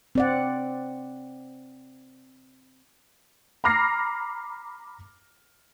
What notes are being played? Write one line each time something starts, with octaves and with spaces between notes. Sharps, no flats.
C4 D5 F#5
A#5 B5 D6 F6 A#6 C7